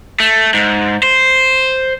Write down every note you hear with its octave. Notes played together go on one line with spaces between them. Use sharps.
A3
G#2
C5